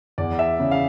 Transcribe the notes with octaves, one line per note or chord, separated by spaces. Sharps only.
E2 D5
E5
C#3
F5